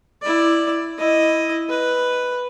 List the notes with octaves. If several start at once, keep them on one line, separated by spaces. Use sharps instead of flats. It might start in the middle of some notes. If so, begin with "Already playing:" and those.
E4 D5
E4 D#5
B4